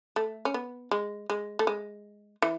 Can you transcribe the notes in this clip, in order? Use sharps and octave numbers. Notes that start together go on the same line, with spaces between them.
A3
C#4
B3
G#3
G#3
A3
G#3
E3